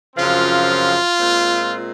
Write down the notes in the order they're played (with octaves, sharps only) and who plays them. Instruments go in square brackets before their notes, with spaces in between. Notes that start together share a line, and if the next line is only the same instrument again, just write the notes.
[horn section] F#2 C#3 F3 C4 F4
A#2 G#3 C4